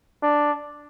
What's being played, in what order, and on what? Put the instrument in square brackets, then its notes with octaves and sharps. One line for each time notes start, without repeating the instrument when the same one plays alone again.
[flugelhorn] D4